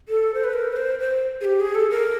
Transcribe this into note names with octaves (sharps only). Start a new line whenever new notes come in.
A4
C5
B4
A#4
B4
C5
C5
G#4
G4
G#4
A4
A#4